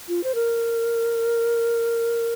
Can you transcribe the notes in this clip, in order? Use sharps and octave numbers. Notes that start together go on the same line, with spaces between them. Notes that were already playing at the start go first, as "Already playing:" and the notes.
F4
C5
A#4